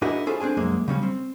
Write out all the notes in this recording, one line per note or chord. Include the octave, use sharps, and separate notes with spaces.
D4 E4 F#4 G#4 A#4 D#5
C#4 F4 G#4 A4 C5
C4 D4 G#4 G#5
C2 F#2 G#3 A#3
C#3 G3 C#4
C4